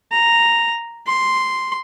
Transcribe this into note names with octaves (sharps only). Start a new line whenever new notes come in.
A#5
C6